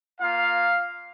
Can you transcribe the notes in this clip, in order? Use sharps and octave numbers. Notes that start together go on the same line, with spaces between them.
A#3 F4 F5